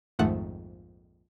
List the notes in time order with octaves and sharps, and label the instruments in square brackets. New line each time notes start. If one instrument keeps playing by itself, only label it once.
[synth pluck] A#1 F2 G#2 D#3 A3 F#5